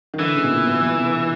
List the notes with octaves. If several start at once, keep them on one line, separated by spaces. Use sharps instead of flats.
D#3
D3 E3
C#3
B2
A#2
B2
B2
C3